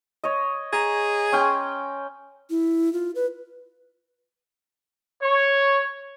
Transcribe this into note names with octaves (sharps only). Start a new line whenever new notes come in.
C#5 D#5
G#4 A#5
C#4 G5 C6
E4
F4
B4
C#5